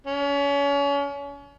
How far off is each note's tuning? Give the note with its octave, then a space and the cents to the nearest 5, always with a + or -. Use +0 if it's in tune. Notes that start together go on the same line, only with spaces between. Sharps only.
C#4 +35